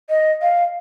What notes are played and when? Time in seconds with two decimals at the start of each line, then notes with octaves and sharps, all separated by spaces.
0.10 D#5
0.42 F5